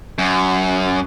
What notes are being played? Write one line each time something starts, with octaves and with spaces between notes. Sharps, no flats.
F#2